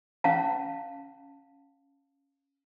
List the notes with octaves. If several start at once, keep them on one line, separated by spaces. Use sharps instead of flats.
C#4 F5 A5